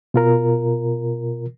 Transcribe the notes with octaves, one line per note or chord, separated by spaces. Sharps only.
B2 F4 A#4